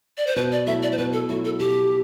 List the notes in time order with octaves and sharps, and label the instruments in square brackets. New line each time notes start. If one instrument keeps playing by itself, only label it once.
[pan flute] D5
C5
[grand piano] B2 [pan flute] B4
[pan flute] D5
[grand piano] F#3 A3 E4 [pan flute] E5
[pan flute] D5
C5
[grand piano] B2 [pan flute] B4
[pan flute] A4
[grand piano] F#3 A3 E4 [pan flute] F#4
[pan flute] A4
[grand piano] B2 [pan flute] G4